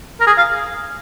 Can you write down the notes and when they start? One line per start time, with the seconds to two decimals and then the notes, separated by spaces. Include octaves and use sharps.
0.20 A#4
0.27 G#4
0.37 F5